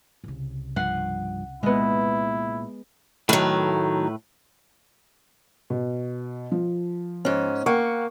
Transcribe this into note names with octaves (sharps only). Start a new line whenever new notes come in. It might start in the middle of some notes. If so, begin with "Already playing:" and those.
C2 C#3
G2 F3 F#5 C7
A#2 G#3 B3 E4
A2 D#3 F#3 A3 B4
B2
F3
G#2 C#4
A#3 F#5 G5 C#6